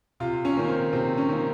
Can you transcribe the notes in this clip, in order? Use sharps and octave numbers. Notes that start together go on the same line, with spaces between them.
C3 F4
C#4
D#3 A#3
C4
C3 C4
C#4
D#3 A#3